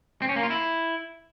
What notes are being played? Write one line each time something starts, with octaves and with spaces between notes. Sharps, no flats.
C4
C#4
A#3
F4
E4